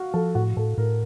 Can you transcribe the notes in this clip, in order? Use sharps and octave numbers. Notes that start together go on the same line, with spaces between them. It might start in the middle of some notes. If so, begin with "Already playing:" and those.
Already playing: F#4 F5
F3 A4
A2 F#4
A2 A4
A2 A#4